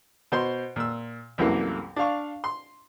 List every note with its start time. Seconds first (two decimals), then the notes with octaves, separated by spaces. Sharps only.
0.32 B2 C5 C6
0.76 A#2 E6
1.38 C2 F#2 E3 A3 A#3
1.96 D4 D5 F5 C#6
2.44 C6